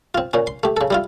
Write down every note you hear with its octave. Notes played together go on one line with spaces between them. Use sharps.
C4 F4
A#2 C#4
C6
A3 G4
C#3 A4
G3 E4 F4